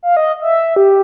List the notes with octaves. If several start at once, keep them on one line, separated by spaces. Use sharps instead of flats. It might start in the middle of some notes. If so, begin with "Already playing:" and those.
F5
D#5
E5
G4